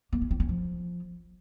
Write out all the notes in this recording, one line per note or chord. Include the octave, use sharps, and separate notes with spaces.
A#3
C#4
C4
C#4
F3